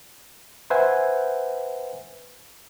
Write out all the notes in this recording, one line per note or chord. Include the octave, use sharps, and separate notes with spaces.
B4 C5 E5 F#5 G#5